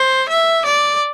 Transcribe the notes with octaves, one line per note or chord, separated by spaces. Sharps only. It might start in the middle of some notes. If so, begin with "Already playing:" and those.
Already playing: C5
E5
D5